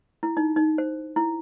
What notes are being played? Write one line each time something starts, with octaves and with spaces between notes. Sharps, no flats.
E4
D#4
D#4
C5
E4